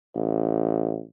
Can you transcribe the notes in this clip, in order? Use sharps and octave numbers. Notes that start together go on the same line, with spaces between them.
A1